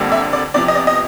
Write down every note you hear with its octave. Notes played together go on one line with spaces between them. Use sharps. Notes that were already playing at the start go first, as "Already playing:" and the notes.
Already playing: F2 D3 G3 A#3
E5
D5
E2 C3 F3 D5
D#5
D5
D#5